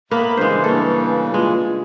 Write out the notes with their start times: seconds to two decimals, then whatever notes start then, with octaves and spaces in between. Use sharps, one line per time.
0.11 A2 A#3 B3 B5
0.37 G2 C#3 E3 G#3 D4 C5
0.64 A#3 C#4 A4
1.34 G#3 F4